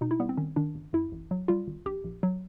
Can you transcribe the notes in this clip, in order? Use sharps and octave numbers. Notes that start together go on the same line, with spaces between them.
B2 D#4
E4
G3 B3
C4
D#3 C#4
D#3 D4
G1
F#2 E4
A1
F#3
G3 F4
G#1
A#1 G4
A#1
F#3